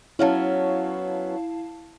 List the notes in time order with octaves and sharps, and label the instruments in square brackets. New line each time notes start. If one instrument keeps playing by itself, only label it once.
[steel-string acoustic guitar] F#3 B3 C#4 [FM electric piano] E4 F5 A5